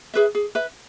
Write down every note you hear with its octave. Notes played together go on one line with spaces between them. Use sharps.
G#4 B4 E5
G#4
B4 E5